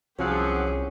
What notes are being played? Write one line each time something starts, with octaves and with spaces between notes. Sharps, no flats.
C2 F3 F#3 C#4 G4 G#4